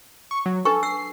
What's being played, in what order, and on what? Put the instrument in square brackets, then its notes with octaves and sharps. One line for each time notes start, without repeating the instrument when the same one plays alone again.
[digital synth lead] C#6
F#3
[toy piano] D4 B4 C#6 [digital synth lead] A4
[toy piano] E6 [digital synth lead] C7